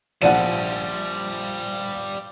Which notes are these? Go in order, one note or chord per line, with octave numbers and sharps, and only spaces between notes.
A#1 F3 G3 F4 D5 F#5 D#7